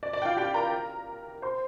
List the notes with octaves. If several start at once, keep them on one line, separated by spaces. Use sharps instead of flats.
D5
D5
G5
F4 F5
G4 G5
A#4 A#5
C5 C6